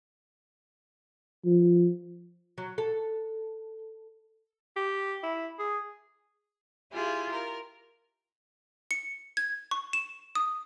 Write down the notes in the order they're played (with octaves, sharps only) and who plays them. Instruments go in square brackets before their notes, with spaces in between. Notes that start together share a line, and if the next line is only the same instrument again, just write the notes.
[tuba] F3
[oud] F#3
A4
[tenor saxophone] G4
E4
G#4
[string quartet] E4 F4 G4 G#4
A#4
[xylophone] C#7
G#6
C#6
E7
D#6